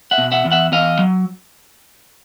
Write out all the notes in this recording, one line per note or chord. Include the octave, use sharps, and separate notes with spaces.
E5 F#5
B2
E5 F#5
E2
E5 F#5
E2 D#5 F5
F#3